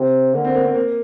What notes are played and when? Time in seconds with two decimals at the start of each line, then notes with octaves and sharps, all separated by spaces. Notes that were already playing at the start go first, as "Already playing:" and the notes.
Already playing: C3
0.34 D3 A#3
0.45 C4
0.55 A#3
0.65 C4
0.75 A#3